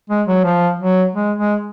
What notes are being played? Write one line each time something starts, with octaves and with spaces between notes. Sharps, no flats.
G#3
F#3
F3
F#3
G#3
G#3